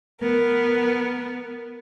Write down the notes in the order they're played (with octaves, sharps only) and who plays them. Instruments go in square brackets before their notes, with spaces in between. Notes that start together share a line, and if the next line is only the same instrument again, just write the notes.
[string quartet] B3 A#4